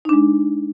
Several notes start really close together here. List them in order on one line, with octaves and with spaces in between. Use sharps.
D#4 D4 G#3